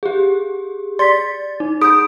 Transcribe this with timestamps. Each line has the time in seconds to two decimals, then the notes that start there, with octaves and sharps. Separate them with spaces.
0.03 G4 G#4
0.99 D5 C6 A6 B6
1.60 D#4
1.81 G#4 B5 D#6 G6 D7